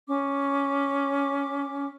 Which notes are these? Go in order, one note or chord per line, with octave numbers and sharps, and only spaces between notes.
C#4 D6